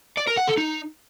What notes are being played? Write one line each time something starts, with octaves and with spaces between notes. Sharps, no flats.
D5
A#4
F#5
A4
D#4